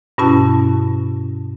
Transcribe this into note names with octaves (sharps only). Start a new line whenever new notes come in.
G2 B2 C#4 E4 F#4 A5